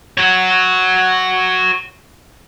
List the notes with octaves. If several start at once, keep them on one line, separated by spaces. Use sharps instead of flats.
F#4 C#5